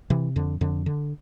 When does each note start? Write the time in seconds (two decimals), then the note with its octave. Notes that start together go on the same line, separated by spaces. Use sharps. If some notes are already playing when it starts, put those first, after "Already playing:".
0.10 C3 E3
0.36 F2 D3
0.61 F2 D3
0.86 D3